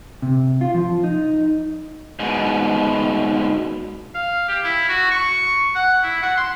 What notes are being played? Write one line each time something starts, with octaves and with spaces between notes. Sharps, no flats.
C3
F4
F3
D#4
G#2 B2
F5
G4
E4
F#4
C#6
F#5
E4
F#5
C6